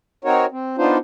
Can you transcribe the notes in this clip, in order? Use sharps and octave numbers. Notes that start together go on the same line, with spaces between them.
C4 D#4 F#4 A#4 C#5
C4
B3 D4 D#4 F4 C5